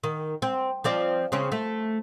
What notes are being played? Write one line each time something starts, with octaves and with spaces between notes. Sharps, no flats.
D#3
C4
F3 C4 D5
C#3 C4 C#4
A3